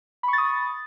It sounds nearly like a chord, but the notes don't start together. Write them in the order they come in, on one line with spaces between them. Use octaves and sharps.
B5 C#6 A6 D#6